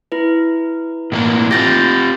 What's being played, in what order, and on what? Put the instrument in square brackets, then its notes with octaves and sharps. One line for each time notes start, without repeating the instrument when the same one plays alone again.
[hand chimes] E4 B4
[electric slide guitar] A2 E3 A#3
[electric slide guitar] C4 F4 G4 [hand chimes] G6 A6 A#6